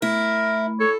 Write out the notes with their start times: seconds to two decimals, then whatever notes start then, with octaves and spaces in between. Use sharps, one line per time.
0.02 A3 E4 A#4
0.80 A4 C#5